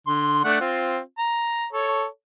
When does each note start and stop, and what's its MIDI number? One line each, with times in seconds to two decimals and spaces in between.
0.07 0.43 50
0.07 0.43 84
0.44 0.58 57
0.44 0.58 62
0.44 0.58 78
0.60 0.99 60
0.60 0.99 65
1.18 1.66 82
1.72 2.06 69
1.72 2.06 73